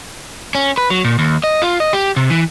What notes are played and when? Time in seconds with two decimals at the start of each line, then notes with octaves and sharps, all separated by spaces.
0.55 C#4
0.78 B4
0.90 F#3
1.05 A#2
1.19 D#2
1.44 D#5
1.62 F4
1.80 D#5
1.93 G4
2.16 C3
2.30 E3